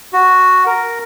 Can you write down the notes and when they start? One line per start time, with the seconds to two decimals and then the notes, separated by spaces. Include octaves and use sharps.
0.13 F#4
0.66 A#4